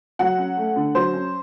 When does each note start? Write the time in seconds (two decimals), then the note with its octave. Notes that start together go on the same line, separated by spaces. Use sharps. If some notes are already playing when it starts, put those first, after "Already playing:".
0.19 F#3 F#5
0.38 C#4
0.57 A3
0.76 D3
0.95 F#3 C5
1.14 C#4